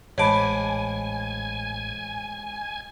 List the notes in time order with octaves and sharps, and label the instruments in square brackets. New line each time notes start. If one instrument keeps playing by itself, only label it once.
[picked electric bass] A1 [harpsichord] G#2 D6 [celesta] C#5 A5 B5 [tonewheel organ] G#5